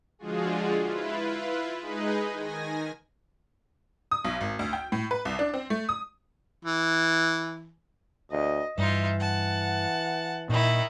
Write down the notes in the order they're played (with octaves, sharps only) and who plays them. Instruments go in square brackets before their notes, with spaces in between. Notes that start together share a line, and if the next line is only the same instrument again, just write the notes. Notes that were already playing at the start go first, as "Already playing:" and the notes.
[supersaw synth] D3 F3 G#3 F4 F#4 G#4
E4 F4 B4
G#3 D#4 G#4 B4 D#5
D#3 G#5 A#6
[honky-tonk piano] D#6
B1
G#1
D2
G5
A2
B4
C2
D4
C4
A3
D#6
[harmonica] E3
[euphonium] D2 [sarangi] D#5
[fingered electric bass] G2 [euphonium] E3 [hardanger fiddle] D#4 F4 [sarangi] E5
[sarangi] F#5 [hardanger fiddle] A5
[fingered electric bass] A#2 [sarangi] D#3 [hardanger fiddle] D#4 E4